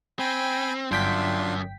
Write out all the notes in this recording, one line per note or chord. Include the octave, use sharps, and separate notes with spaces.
C4 G5 G#5 B5
G1 F#2 D4 F4 G5 C6 B6